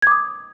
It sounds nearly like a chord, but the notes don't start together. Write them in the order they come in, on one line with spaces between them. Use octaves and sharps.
G#6 D6 D#6